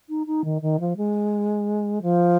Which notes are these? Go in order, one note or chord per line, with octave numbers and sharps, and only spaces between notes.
D#4
D#4
D#3
D#3
F3
G#3
F3